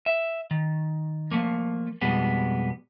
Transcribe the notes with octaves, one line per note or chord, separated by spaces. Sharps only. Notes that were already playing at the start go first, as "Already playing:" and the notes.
E5
D#3
F3 A3 A#3
F2 B2 G3 G#3 B3